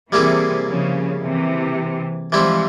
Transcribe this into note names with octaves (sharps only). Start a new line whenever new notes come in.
C3 E3 G3 A#3 E4 G#4
C#3 F3
C3 E3
E3 F3 G3 G#3 C4 E4